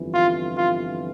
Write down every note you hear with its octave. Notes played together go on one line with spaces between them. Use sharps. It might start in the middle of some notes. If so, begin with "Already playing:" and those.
Already playing: G1 F2 E3
F4
F4